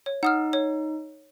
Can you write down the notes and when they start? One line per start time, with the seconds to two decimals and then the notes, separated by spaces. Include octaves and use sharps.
0.06 C#5
0.23 D#4 F#5 D#6 F6
0.53 C#5